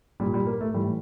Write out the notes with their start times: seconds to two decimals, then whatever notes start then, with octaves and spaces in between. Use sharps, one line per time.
0.20 A#2 G3
0.34 G3
0.47 A#3
0.61 A3
0.74 A2 E3 G3